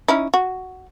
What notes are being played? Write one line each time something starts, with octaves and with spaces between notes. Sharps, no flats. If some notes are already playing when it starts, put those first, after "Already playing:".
C#4 D#4 E4
F#4